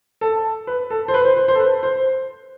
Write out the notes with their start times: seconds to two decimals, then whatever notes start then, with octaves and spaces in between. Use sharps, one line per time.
0.21 A4
0.67 B4
0.90 A4
1.08 C5
1.14 B4
1.25 C5
1.37 C5
1.48 C5
1.55 A4
1.59 B4
1.83 C5